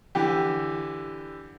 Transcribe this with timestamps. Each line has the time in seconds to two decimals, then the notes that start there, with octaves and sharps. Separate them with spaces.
0.15 D3 E3 G4